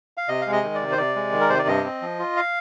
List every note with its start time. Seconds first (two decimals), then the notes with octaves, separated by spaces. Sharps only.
0.17 F5
0.28 C3 D#5
0.42 F5
0.47 G#3
0.52 D#5
0.64 D#3
0.75 D5
0.81 C3
0.92 C5
0.98 C3 D5
1.16 G#3
1.32 D#3
1.41 A#4
1.49 C3 C5
1.59 D5
1.67 G2 D#5
1.85 C4
2.02 F3
2.19 F4
2.37 F5